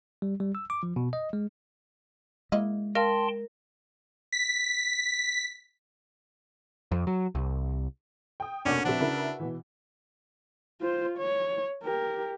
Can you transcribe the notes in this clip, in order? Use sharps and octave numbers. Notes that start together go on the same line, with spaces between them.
G3
G3
E6
D6
F3
B2
D#5
G#3
G#3 A#3 E4 D#5
A#4 F5 G5 A5 C6
B6
F2
F#3
C2
G5 D#6
F1 B2 A#3 C#4 D4 D5 F#5
C3 F3 D4 F#4 B4 E5
C#3 E4 A#4
B2 E3
F4 C5
C#5
G4 A#4